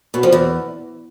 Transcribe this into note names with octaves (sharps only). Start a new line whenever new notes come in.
B2
F3
E2